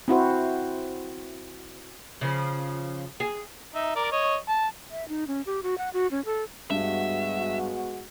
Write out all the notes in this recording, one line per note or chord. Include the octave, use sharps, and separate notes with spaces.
C4 E4 F#4 C5
C#3 F3
G#4
D#4 E5
A#4 D5
C#5 D#5
A5
E5
D#4
C#4
G4
F#4
F#5
F#4
C#4
A4
G2 G#3 B3 F#4 E5